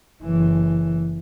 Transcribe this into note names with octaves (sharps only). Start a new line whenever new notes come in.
F#1 E3